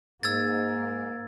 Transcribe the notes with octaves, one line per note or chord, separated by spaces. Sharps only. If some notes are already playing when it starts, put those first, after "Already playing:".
G#2 A#3 E6 G#6 A6